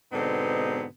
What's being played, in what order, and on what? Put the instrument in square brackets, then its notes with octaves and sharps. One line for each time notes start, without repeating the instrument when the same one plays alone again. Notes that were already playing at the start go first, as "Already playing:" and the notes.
[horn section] G#2 B2 D3 B3 C4 D#4